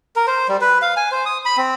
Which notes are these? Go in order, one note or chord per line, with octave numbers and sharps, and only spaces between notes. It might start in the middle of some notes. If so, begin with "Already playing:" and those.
A#4
C5
G3
B4
F5
G#5
C5
D#6
B5
C4